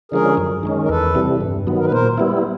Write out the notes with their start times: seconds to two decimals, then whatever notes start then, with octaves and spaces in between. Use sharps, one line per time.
0.12 D3 F3 G#3 C#4 G#4 A#4
0.37 F#2
0.63 D#3 G#3 C#4
0.82 A#4
0.89 E2 A4 B4
1.15 C3 E3 G3
1.41 G2
1.67 D#3 F#3 B3
1.78 A#4
1.85 B4
1.92 A#2 A#4 C5
2.18 G3 B3 E4